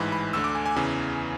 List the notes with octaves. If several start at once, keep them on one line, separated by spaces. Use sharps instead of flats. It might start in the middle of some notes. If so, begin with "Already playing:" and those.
Already playing: A1 G#2 E3 B5
B5
D2 D3 E6
D6
G#5
G#5
E2 C#3 E3 G#5